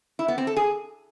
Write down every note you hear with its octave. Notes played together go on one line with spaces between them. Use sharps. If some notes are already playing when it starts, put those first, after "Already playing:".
E4
B3
C4
A4
G#4